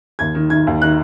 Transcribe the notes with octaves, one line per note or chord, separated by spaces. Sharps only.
D#2 G#6
D#3
D#3 G#6
D#2
D#3 F#6